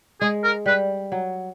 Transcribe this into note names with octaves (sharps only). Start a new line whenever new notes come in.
G#3 G#4
A#4
G3 B4
F#3